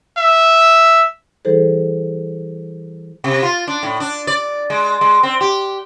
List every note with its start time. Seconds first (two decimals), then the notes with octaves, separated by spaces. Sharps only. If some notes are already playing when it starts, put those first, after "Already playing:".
0.18 E5
1.45 E3 G3 E4 G#4 A4 C5
3.24 C3
3.43 F4
3.68 D4
3.83 A2
4.00 D4
4.27 D5
4.70 G#3
5.01 G#3
5.23 C4
5.41 G4